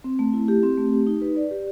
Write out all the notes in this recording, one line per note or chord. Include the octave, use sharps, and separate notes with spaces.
C4
A3
E4
G4
C4
A3
G4
D#4
B4
D5
G4